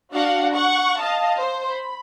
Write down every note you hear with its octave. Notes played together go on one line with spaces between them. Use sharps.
D4 F#4 F5 F#5
F#5 C#6
D#5 F5 A5
C5
B5